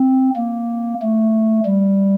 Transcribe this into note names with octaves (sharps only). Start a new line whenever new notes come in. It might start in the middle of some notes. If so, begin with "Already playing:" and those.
Already playing: C4
A#3
A3
G3